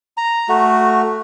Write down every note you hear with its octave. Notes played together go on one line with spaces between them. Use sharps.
A#5
A3 F#4